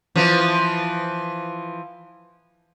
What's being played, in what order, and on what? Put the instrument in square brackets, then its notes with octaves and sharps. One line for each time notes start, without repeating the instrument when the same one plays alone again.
[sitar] E3 F3